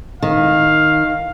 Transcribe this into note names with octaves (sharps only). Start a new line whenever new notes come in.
D#3 F5